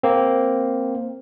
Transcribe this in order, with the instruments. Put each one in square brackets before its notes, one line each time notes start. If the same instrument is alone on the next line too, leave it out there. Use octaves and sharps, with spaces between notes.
[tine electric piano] A#3 C4